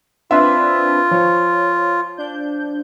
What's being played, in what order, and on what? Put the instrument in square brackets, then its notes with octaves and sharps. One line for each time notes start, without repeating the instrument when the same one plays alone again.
[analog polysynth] C4 D4 B4 [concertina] F4 [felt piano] E5 C6 E6
[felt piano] F3 [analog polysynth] C#5
[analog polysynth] D4 G6